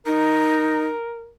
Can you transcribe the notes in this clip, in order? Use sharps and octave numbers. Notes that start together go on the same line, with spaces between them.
D#4 A#4